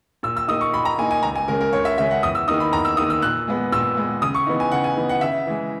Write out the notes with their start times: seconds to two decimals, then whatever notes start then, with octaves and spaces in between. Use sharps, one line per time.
0.23 A#2 E6
0.37 E6
0.48 A#3 D#4 D#6
0.61 C#6
0.74 A#2 B5
0.85 A#5
0.99 A#3 G#5
1.02 D#4
1.11 G#5
1.23 C#2 A#5
1.36 G#5
1.48 C#3 G#3 C#4 A#4
1.61 A#4
1.73 C#2 C#5
1.85 E5
1.98 C#3 G#3 C#4 E5
2.11 F#5
2.23 E2 D#6
2.35 E6
2.48 D#3 A#3 D#4 D#6
2.60 B5
2.73 E2 A#5
2.85 E6
2.97 D#3 A#3 D#4 D#6
3.10 E6
3.22 A#2 F#6
3.48 G#3 B3
3.72 A#2 E6
3.97 G#3 B3
4.22 C#3 D#6
4.34 C#6
4.47 E3 B3 D#4
4.60 G#5
4.71 C#3 F#5
4.84 G#5
4.97 E3 B3 D#4
5.09 F#5
5.21 C#3 E5
5.47 E3 G#3